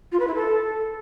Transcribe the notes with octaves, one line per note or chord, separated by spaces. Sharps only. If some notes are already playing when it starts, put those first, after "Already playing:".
F4
B4
E4
A4